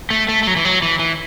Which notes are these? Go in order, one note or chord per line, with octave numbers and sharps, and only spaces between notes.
A3
A3
A3
F#3
E3
F#3
E3
E3